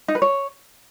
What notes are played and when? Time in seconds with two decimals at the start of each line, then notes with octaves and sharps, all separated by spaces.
0.08 D#4
0.15 B4
0.22 C#5